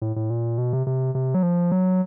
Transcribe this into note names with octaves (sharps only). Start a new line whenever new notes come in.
A2
A2
A#2
B2
C3
C3
C3
F#3
F3
F#3